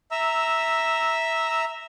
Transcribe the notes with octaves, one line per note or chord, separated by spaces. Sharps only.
E5 A#5 E6